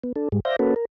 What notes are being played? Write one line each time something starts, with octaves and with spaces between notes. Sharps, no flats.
B3
D4 A4
G#2 G3 G#3
C5 D5 E5 F5 G6 A#6
A#3 C#4 F#4 A4 B4
A#4